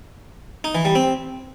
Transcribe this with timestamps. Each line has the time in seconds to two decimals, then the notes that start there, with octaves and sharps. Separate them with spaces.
0.64 D#4
0.75 E3
0.85 G3
0.95 C4